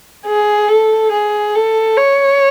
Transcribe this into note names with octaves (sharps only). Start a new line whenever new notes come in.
G#4
A4
G#4
A4
C#5